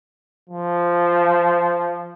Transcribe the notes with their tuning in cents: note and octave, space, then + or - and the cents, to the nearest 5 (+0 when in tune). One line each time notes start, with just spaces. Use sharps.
F3 -10